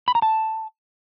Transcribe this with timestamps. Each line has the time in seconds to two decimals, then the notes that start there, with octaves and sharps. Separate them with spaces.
0.08 B5
0.15 A#5
0.22 A5